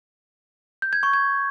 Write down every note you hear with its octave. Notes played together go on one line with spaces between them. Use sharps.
G6
G#6
C#6
G#6